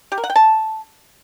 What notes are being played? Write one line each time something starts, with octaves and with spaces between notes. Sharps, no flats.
G4
A#4
F#5
G5
A5